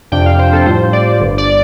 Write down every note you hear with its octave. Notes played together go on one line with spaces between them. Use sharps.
F2 C3 F3 D4 G5
F5
C5
A4
A2 G3 F4 C5
D5
G1 G2 D3
D5